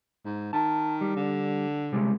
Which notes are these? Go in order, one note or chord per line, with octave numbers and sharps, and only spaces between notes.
G#2
D#3 A5
G3
D3
C3 G3 G#3